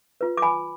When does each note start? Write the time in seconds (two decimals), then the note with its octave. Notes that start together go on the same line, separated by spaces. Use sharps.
0.21 F4 B4
0.37 D6
0.42 G#5 B5